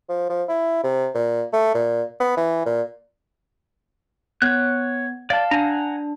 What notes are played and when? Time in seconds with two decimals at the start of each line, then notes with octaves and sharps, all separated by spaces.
0.09 F3
0.30 F3
0.49 E4
0.84 C3
1.15 A#2
1.53 A3
1.75 A#2
2.20 B3
2.37 E3
2.66 A#2
4.42 B3 C#5 F#6
5.30 D5 F5 A5
5.51 D4 F#5 G#5 A#5